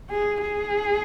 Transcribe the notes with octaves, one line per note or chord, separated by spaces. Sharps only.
G#4
G#4